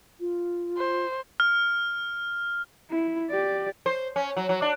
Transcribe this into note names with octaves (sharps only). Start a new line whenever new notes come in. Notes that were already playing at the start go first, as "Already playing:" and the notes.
F4
C5
F6
E4
G4 D5
C5
C#4
F#3
F#3
D4